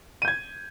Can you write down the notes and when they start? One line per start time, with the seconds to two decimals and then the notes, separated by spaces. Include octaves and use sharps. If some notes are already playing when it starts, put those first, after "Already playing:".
0.22 D#7
0.25 G6
0.28 G#6